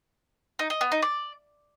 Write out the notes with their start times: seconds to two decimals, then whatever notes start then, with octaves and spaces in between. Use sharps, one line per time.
0.59 D#4
0.70 D#5
0.81 B3
0.92 D#4
1.02 D5